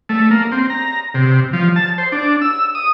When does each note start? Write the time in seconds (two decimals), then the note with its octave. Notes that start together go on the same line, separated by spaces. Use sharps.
0.09 A3
0.31 A#3
0.52 C4
0.70 A#5
1.14 C3
1.53 F3
1.76 A5
1.98 C5
2.12 D4
2.42 E6
2.75 D#6